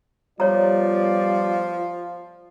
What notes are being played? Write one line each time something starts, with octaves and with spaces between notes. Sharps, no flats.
F3 G3 B3 F4 C#5 D5 A#5